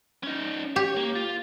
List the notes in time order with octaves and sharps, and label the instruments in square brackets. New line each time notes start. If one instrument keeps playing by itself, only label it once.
[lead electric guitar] C#4 D#4
[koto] G4 [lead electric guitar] C#5
[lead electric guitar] A#3
F4